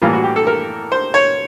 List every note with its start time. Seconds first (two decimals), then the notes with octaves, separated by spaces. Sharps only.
0.02 A2 E3 G3 A#3 F4
0.13 F#4
0.24 G4
0.36 A4
0.47 A#4
0.92 C5
1.14 C#5